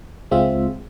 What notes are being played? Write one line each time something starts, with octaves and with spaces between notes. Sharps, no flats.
C#2 G#3 C4 F4 E5